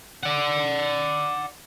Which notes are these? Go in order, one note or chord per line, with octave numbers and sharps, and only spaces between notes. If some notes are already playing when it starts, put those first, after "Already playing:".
D5 F#5